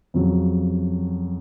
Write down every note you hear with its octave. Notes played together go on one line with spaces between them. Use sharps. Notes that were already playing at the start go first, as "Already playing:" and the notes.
F2 C#3 F#3